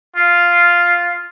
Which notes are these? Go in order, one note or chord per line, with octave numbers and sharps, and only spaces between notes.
F4